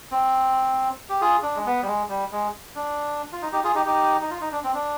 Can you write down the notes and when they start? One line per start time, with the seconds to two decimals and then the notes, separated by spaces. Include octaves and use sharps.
0.11 C4
1.09 G4
1.21 F4 G#4
1.43 D4
1.56 G#3
1.66 B3
1.82 G3
1.87 G#3
2.09 G3
2.32 G#3
2.76 D4
3.32 F4
3.42 D#4
3.52 D#4 G4
3.64 F4 G#4
3.75 D#4 G4
3.86 D#4 G4
4.21 D#4
4.31 F4
4.41 D#4
4.52 D4
4.64 C4
4.74 D4